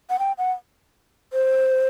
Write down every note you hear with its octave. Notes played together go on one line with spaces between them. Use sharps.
F#5
G5
F#5
C5